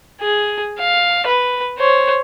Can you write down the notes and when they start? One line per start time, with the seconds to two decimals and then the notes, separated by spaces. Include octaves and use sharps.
0.21 G#4
0.79 F5
1.27 B4
1.78 C5 C#5